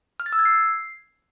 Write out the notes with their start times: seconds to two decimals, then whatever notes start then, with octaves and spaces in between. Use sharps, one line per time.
0.20 F6
0.26 A6
0.33 E6
0.39 G#6
0.45 C7